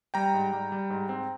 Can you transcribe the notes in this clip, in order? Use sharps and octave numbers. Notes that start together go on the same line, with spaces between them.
G3 G5 A#5
G#2
G3
G3
G#2
C4